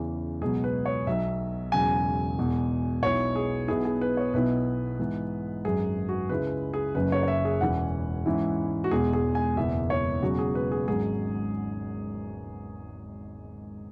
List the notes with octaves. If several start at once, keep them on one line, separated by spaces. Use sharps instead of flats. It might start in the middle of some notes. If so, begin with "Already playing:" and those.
Already playing: E2 C#3 E3 C#4
C#2 B2 F#3 B3 G#4
B4
C#5
B1 B2 F#3 E5
E1 E2 C#3 F#3 G#5
E1 E2 B2
B1 B2 B3 E4 C#5
G#4
B1 B2 B3 E4 G#4
G#4
B4
C#5
B1 B2 B3 E4 B4
G#2 E3 B3
G#1 F#2 F#3 G#4
F#4
C#2 C#3 G#3 E4 B4
G#4
F#1 F#2 C#3 F#3 B4
C#5
C#5
E5
G#4
E1 E2 E3 C#4 E4 F#5
G#2 E3 C#4 E4
F#4
E1 E2 B2 G#3 G#4
G#4
G#5
F#1 E2 B2 B3 E4 E5
C#5
E1 E2 C#3 F#3 F#4
G#4
B4
G#4
G#1 G#2 F#3 C#4 G#4